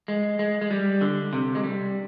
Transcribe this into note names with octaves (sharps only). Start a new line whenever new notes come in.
G#3
G#3
G#3
G3
D3
C3
G#3
G3